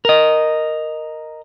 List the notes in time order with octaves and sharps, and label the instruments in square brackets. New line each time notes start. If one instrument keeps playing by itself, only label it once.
[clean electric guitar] A#4 D#5